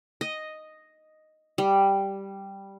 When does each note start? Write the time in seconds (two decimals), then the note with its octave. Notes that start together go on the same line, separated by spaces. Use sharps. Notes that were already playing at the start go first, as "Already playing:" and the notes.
0.21 D#5
1.58 G3